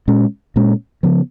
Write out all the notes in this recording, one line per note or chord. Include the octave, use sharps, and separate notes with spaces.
A#2 G#3 C#4
A#2 G#3 C#4
C#3 F3 B3